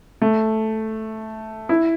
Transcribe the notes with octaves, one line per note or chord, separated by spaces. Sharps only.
A3
E4